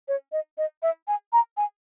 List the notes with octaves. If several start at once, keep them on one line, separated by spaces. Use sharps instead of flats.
C#5
D#5
D#5
E5
G#5
A#5
G#5